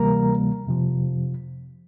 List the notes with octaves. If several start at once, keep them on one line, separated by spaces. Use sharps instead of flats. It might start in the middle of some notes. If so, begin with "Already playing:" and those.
Already playing: D2 C3 E3 G3 A#3 A#4 A#5
F2 C3 F3